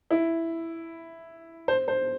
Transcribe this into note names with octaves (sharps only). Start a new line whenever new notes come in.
E4
C5
C5